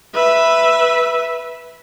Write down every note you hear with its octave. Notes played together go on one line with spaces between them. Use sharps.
B4 E5